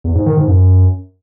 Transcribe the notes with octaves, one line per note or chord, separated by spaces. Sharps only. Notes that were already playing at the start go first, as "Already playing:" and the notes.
E2
G#2
D#3
G#2
F#2